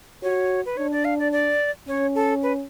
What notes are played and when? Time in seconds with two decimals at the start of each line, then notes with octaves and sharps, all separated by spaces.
0.22 F#4 C#5
0.66 B4
0.77 D4 C#5
0.92 D5
1.05 F5
1.19 D5
1.32 D5
1.88 C#4 C#5
2.15 A4
2.43 B4